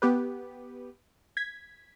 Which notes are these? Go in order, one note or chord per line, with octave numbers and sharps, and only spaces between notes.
B3 G4 B4
G#6 B6